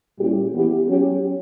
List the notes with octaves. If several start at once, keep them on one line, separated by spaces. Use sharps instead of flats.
A#2 G3 C#4 E4 G4
E3 B3 E4 G4
F#3 C#4 G4